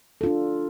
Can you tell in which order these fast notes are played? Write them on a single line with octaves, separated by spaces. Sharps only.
A4 F4 D4